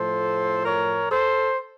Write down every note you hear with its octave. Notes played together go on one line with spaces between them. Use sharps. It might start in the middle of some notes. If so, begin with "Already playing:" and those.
Already playing: A2 F3 A4 C5
A#4 C#5
A4 C5